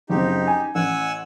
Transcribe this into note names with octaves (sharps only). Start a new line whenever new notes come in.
F#1 C4 D#4 G4
G#5
A1 F#5 G#5 E6